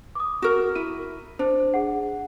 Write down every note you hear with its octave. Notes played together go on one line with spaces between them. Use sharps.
D6 D#6
F#4 A#4
E4 D#7
D4 C5
G#4 F#5